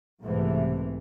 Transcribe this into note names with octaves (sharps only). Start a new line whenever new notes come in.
B1 G#2 C3 E3 A3